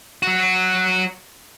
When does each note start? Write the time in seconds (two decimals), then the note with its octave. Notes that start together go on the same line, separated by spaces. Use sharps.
0.23 F#3 F#4